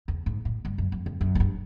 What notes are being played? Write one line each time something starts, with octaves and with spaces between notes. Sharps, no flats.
E2
G#2
A2
G2
F#2
F2
F2
F#2
G#2
G2